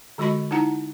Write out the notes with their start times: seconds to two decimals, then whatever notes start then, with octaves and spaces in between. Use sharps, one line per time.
0.18 D3 G#3 F#4 D#5 B5 C#6
0.51 D#4 E4 F#5 A#5